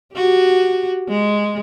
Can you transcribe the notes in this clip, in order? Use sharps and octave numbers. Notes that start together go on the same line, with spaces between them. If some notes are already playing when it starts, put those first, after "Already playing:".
F#4 G4
G#3